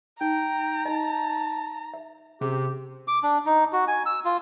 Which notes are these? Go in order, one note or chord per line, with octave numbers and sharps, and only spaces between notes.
D#4 G5 A#5
D#4 D#5 A5
E5
C3 C#4 G4 G#4 C6
D6
D4
D#4
F#4
G#5
E6
F4